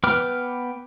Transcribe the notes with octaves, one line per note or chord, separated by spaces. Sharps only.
B3 B4 G5 D6 F6